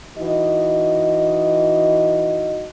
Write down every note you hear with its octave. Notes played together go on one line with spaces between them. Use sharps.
E3 D#4 F#4 D#5